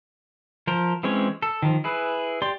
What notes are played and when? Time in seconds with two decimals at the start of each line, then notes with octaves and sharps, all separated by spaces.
0.67 F3 A#4 C5
1.03 E3 G#3 C4 C#4 C#5
1.42 A4
1.62 D#3 F3
1.84 E4 G#4 B4
2.42 G4 D5 C6